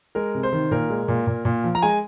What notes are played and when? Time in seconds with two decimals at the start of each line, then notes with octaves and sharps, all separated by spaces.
0.15 G#3 A#4
0.35 C3
0.43 C5
0.53 D#3
0.71 A#2 A#4
0.90 G#3
1.08 A#2
1.27 A#2
1.45 A#2
1.64 F3
1.75 A#5
1.83 G#3 G#5